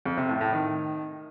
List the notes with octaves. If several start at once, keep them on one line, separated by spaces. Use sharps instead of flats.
F2
C3
A2
A2
D#3